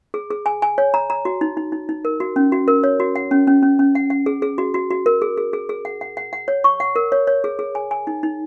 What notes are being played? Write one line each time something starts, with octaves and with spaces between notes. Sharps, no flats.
G#4
G#4
G#5
G#5
C#5
A#5
A#5
F#4
D#4
D#4
D#4
D#4
A#4
F#4
C#4
F#4
A#4
C#5
F#4
F#5
C#4
C#4
C#4
C#4
F#5
F#5
G#4
G#4
F#4
F#4
F#4
A#4
G#4
G#4
G#4
G#4
F#5
F#5
F#5
F#5
C#5
C#6
F#5
A#4
C#5
C#5
G#4
G#4
G#5
G#5
D#4
D#4